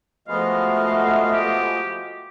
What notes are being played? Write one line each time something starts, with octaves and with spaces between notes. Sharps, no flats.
F3 G#3 A3 B3 F#4 D#5 F5
G4